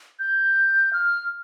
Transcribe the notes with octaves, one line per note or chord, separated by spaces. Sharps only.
G6
F6